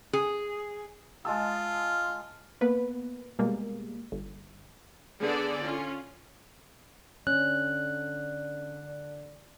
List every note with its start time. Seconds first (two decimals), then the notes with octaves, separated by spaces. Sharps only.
0.13 G#4
1.25 G#3 F4 A5 E6
2.61 A#3 B3 B4
3.39 B2 G3 G#3 A#3
4.12 G1
5.21 D3 B3 G#4 A4 D5
5.61 C#4 F4
7.27 D3 C#4 D5 F#6